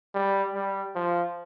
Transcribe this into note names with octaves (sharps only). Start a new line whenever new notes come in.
G3
G3
F3